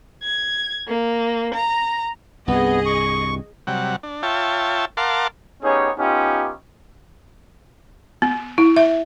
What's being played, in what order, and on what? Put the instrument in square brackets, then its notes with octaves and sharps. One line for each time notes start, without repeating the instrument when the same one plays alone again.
[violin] G#6
A#3
A#5
[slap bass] C2 G2 [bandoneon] B3 [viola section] G#4 D#5
[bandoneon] C#6
[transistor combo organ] C3 F#3 G3 F#5
D4
F4 C#5 E5 G5 A5
A#4 F5 F#5 A5 C6 D6
[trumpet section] B3 C#4 D#4 G4 G#4 C#5
B3 C#4 D#4 F4 G4
[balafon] B3
E4
E5